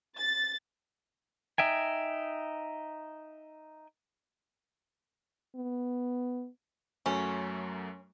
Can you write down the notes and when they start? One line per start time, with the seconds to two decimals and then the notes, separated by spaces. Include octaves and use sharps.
0.17 A6
1.58 D#4 E5 G5 G#5
5.56 B3
7.06 F#2 F#3 A3 C#4